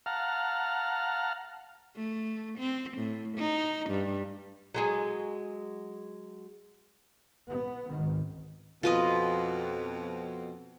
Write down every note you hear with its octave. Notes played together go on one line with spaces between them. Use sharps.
F5 F#5 A5 A#5 F6
A3
C4
A2
D#4
G2
F#3 G#3 G#4
B3
G#1 C#2 D#3
F2 B2 F4 B4 D#5